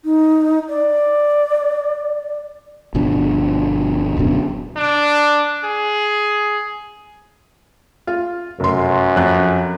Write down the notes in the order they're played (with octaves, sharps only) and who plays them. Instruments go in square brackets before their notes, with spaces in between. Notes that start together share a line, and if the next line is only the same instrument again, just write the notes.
[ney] D#4
D5
[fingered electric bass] G1 B2 F3 D4
D1 F#2 B2 D4
[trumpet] D4
G#4
[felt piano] F4
[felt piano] F1 C6 [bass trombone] F#2
[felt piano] F2 F3 F#6